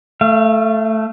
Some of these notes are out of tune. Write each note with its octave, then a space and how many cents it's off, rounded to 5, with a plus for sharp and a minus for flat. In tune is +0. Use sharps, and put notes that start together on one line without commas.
A3 +0 F5 -35